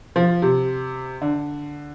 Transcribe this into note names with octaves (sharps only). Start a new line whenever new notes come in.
F3
C3
D3